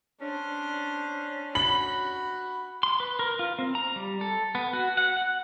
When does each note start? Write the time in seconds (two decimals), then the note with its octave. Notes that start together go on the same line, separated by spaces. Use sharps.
0.20 C#4 D4 C5
1.55 F#4 B5 F#7
2.83 C6
3.00 B4
3.19 A#4
3.39 F4
3.59 C4
3.75 A#5
3.96 G3
4.21 A4
4.55 B3
4.73 F#4
4.97 F#5
5.17 F#5